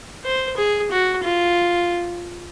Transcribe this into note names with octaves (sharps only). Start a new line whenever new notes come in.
C5
G#4
F#4
F4